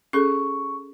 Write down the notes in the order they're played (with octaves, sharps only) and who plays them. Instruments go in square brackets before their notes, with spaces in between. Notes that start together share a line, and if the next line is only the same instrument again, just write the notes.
[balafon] C#4 G#4 A4 [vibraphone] C#6